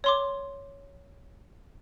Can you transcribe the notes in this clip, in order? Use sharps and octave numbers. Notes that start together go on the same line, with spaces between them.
C#5 C6 D6